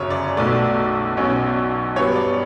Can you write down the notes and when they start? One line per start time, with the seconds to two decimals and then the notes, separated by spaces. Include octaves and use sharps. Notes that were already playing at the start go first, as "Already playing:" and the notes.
Already playing: G1 F#2 C#3 F#3 C#5
0.10 D5
0.37 B1 B2 A3 D5
1.17 B1 B2 F#3 C#4
1.96 G2 F#3 B3 C#5
2.16 D5